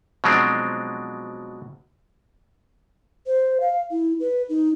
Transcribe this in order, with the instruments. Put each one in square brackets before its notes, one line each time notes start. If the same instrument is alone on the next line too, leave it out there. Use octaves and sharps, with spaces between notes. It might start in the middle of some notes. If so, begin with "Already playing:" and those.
[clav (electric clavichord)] B2 F3 F#3 G#3 C4 D4
[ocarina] C5
F5
E4
B4
D#4